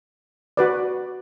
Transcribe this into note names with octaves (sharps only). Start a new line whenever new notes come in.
F#4 B4 D5